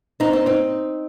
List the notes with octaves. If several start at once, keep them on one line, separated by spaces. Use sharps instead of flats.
C4 D#4
C4 D#4
C4 D#4